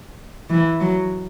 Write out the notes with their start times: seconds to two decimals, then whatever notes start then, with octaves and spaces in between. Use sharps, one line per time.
0.50 E3
0.80 F#3